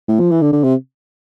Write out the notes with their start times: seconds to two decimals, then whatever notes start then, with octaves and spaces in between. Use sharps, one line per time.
0.08 A2
0.20 F3
0.31 E3
0.42 D3
0.53 D3
0.64 C3